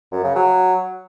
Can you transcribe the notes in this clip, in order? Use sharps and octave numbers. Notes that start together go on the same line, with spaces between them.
F#2
C#3
F#3